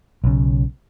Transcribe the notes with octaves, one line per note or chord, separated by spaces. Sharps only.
B1 C#3